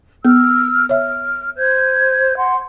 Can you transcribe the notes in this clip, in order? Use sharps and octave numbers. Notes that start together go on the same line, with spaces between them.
B3 E6 F6
C#5 E5 F6
C5 G6 G#6
F#5 C6